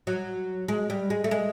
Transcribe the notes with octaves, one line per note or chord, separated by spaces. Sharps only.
F#3
G#3
G3
G#3
A3
G#3